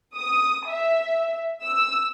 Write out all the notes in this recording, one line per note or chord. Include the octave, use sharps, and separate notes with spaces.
D#6
E5
E6